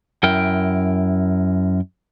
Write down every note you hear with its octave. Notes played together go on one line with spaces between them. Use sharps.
F#2 E4 A#4 G5